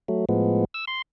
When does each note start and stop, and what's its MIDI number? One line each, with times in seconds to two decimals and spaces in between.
0.08 0.25 54
0.08 0.25 57
0.29 0.65 45
0.29 0.65 53
0.29 0.65 56
0.29 0.65 59
0.74 0.85 88
0.87 1.02 84